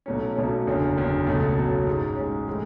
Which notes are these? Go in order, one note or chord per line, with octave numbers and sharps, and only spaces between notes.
B1 B2 F#3 A3 C#4
B1 B2 F#3 A3 C#4
F#1 E2 D3 F#3
F#1 E2 D3 F#3
C#2 B2 F#3 A3
C#2 B2 F#3 A3
G#2 G#3 C#4
G#2 G#3 C#4
A2 E3 G#3